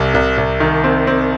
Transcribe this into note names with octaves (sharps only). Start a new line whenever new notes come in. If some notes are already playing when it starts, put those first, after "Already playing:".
Already playing: C2 C3
C2
C2
D#3
C4
C4